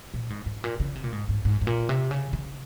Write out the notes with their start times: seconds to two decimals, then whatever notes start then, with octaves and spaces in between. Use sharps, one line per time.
0.14 A#2
0.30 G#2
0.46 G#2
0.64 A#2
0.80 C#3
0.95 C3
1.04 A#2
1.12 G#2
1.29 G#2
1.45 G#2
1.61 G#2
1.67 A#2
1.89 C3
2.11 C#3
2.33 C#3